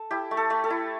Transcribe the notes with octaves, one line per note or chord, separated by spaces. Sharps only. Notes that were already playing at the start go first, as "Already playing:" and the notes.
Already playing: A4
E4 G4
A3
A4
A3
A4
E4